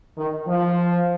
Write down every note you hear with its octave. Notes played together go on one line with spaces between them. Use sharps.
D#3
F3